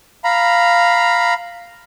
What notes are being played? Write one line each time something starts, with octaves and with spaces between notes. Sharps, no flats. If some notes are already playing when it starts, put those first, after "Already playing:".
F5 A#5 B5